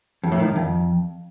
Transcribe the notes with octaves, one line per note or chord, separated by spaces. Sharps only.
F2
A2
D#3
G2
F2